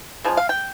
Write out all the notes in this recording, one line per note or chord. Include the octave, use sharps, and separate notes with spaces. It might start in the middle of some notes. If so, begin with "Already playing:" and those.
C#3 F3 G#3
F5
G5